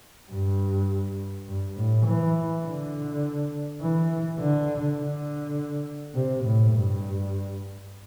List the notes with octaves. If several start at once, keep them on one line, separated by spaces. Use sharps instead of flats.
G2
G2
A2
E3
D3
E3
D3
D3
C3
A2
G2